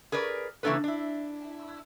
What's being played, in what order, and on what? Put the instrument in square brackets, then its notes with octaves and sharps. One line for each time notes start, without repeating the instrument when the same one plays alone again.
[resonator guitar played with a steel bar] G#4 A#4 B4 D5
C#3 E3 A#3 D4 A4 B4
D4 E4